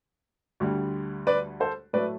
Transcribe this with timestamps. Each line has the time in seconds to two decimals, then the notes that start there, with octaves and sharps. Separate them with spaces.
0.60 D2 D3 G3
1.27 B4 D5
1.60 A4 C5
1.93 A2 F#3 A3 B4 D5